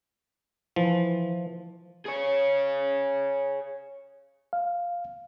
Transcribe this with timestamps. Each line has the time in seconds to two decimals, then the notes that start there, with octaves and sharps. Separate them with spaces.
0.76 E3 F3
2.06 G#4 C#5
4.53 F5